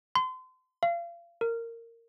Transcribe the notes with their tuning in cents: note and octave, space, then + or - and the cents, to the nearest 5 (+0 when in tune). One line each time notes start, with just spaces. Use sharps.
C6 -35
F5 -30
A#4 -15